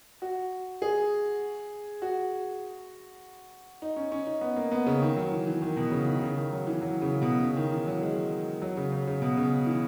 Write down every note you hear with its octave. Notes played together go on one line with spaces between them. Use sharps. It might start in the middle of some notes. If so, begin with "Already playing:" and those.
F#4
G#4
F#4
D#4
C#4
C#4
D#4
B3
A#3
B3
C#3
D#3
F#3
E3
E3
D#3
B2
C#3
D#3
C#3
D#3
F#3
E3
F#3
C#3
B2
C#3
D#3
E3
F#3
G#3
F#3
C#3
C#3
C#3
B2
C#3
E3